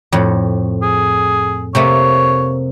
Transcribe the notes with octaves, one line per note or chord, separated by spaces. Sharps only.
F2 A2
G#4
C3 A3 A#3 C#5